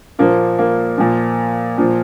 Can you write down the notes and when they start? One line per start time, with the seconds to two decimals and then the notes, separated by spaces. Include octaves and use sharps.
0.19 A#2 F3 A#3
0.59 A#3
0.98 A#2 F3
1.78 A#2 F3